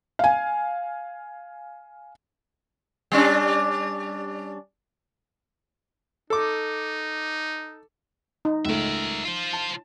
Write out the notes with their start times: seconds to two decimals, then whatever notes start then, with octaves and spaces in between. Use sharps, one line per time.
0.19 F5 G#5
3.12 G3 C#4 D4
6.30 D#4 A4 D6
8.45 D#4
8.65 C#2 A3 A#4 E5
9.25 F4 C5
9.53 A5